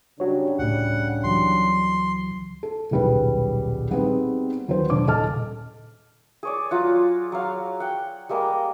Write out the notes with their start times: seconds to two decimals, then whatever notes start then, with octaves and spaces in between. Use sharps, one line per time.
0.20 C#3 G3 D4 F#4 C#5
0.59 C#2 A2 F#5
1.24 C#2 E3 F#3 C6
2.63 A4
2.91 D#1 B1 G3 G#4 B4
3.91 G3 B3 C4 D#4 G#4 B4
4.68 D#2 F#3 B4 C5
4.90 E1 D4 D6
5.07 D#1 A4 D#5 A5 F6
6.43 G#4 C#5 D5
6.71 F#3 F4 F#5
7.32 F#3 F5
7.80 F#5 G5
8.29 G3 G#3 A#3 A#4